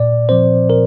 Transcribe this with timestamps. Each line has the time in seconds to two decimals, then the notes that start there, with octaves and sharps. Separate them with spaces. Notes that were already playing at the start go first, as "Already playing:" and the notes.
Already playing: A#2 D5
0.29 F3 C4 C5
0.70 A#2 A#4